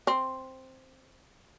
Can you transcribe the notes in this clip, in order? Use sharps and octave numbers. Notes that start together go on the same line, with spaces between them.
C4